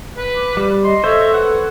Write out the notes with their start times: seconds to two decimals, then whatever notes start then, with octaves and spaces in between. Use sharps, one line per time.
0.17 B4
0.35 D6
0.57 G3
0.84 D#5 C6
1.04 A4 C5 C#5 E5
1.34 B4 F#5